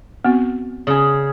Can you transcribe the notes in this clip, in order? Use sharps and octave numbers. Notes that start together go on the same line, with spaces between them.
B3 C4 F#4
C#3 G#4